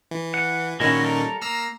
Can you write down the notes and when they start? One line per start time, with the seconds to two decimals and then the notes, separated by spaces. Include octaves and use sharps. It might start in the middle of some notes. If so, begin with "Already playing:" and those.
0.11 E3
0.34 F#5
0.80 A#2 D#3 G#3 C#4 E4 F#4
1.03 G3 A4 A#4
1.42 A#3 A#5 E6 F6